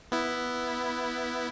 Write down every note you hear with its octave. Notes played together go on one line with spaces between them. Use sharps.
B3 E4